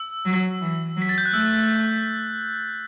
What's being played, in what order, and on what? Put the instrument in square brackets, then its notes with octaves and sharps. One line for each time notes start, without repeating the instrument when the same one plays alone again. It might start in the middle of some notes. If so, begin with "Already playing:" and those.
Already playing: [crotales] E6
[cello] F#3
E3
F#3
[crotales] B6
A6
G6
F#6
[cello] A3 [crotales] E6